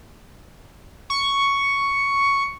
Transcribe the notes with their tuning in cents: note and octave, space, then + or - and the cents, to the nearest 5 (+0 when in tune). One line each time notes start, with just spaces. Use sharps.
C#6 +5